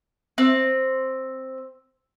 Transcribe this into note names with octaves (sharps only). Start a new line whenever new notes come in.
C4